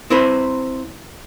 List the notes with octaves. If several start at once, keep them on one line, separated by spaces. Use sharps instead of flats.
C4 E4 B4 C5